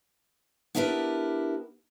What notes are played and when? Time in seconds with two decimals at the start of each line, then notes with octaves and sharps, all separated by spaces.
0.75 B3 D4 E4 G4 A#4 B4